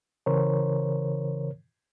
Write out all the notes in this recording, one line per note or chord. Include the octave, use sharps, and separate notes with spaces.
C#3 E3 A#4 C5 C#5